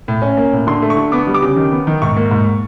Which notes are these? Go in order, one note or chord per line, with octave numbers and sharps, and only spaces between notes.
A2
C#4
A#3
A2
D3 C6
A3
C#6
D3
B3 D6
G3
D6
C#3
D#3
B3
D#3
G#2 C#6
A#3
G#2